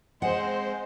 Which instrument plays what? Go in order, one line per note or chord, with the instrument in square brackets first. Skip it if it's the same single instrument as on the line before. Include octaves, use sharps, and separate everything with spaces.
[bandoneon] G#3 [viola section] C4 C5 [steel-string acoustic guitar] F#5